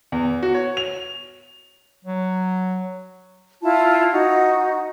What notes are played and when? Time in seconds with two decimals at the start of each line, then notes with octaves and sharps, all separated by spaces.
0.12 E2
0.43 F#4
0.54 C#5
0.77 F7
2.05 F#3
3.62 E4 F4 A5
4.11 D#4 F#4